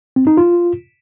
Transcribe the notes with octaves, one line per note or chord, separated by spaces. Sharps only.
C4
D#4
F4